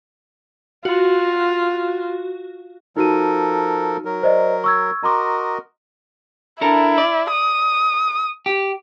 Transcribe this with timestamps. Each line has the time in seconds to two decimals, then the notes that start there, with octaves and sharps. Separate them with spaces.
0.85 F4 F#4
2.97 F3 D#4 F#4 A4 A#4 D#7
4.05 F#3 A#4
4.23 C5 D5 D#5
4.64 C#6 E6 G#6
5.03 F#4 A#4 D#5 A#5 C6 D6
6.61 D4 E4 A4 A#4
6.98 D5
7.31 D#6
8.46 G4